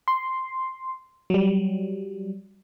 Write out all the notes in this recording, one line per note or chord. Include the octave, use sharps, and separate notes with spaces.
C6
F#3 G3